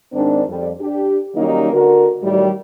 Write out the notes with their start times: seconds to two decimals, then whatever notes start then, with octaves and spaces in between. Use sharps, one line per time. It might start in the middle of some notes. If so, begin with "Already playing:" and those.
0.13 G#2 D#3 C4 D4
0.48 F2 G3
0.81 D4 G4
1.36 D#3 F#3 G3 A#3 C#4 D#4
1.73 D3 F#4 A#4
2.23 A2 D#3 F#3 G3